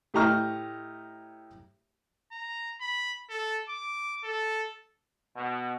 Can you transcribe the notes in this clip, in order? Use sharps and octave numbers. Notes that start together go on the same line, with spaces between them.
A2 G4 D#5 A#5 C#6 F6
A#5
B5
A4
D6
A4
B2